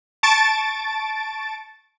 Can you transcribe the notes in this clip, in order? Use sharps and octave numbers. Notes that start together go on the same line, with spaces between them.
A5 C#6 A6 D7